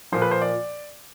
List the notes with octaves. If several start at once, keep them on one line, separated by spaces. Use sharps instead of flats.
A#2 F3 C5
B4
C5
D5